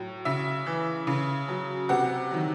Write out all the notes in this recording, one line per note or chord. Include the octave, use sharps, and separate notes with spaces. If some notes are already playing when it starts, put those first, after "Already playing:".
Already playing: A2 F#3
C#3 E5
E3
C#3
F#3
C3 F#5
D#3 F#3